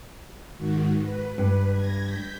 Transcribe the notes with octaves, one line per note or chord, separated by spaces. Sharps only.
G#2 D#3 F#4
B4
G2
G#6 A#6
G6 B6